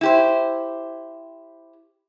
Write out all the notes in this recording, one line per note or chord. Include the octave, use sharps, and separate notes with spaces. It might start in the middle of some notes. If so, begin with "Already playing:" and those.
E4 G4 C5